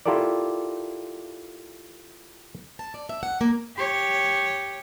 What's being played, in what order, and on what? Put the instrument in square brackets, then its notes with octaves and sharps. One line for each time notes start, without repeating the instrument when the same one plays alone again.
[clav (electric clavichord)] E4 F4 G4 A4 A#4 D5
[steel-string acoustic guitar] A5
D5
E5
F#5
A#3
[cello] G4 C#5